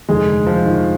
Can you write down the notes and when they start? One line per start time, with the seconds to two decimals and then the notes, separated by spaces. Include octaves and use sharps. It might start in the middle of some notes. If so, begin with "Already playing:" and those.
0.09 F1 D#2 D3 G#3
0.47 F3
0.66 D#3